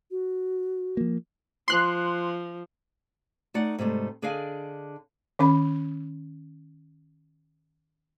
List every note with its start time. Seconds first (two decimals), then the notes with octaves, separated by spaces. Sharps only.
0.11 F#4
0.97 F3 A#3
1.68 F3 C6 F#6
3.54 A3 D#4 D5 F#5
3.78 G#2 C3 G3 A3
4.22 D3 D4 G#4 D#5 F5 G#5
5.39 D#3 C#4 B5